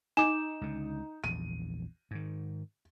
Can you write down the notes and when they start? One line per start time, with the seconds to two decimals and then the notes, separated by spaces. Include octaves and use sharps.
0.17 D#4 G#5 D6 E7
0.61 C#2 D3
1.24 A#1 E2 D#7
2.11 G#2 D#3